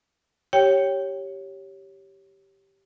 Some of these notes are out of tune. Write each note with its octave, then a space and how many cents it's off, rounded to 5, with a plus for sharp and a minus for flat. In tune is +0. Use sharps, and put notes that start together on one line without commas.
G4 -5 C#5 +0 G5 +0